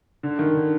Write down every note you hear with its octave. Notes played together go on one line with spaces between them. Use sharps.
D3
D#3
D3